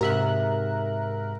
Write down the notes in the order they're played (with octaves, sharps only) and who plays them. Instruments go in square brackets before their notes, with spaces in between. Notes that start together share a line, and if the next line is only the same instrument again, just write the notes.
[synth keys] G#2 E5 F#6 [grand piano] C3 [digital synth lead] A#4